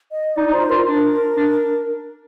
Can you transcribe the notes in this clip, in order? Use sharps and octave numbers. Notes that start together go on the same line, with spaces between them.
D#5
D#4 D5
D#4
F4 C5
F4 A#4
D4
D4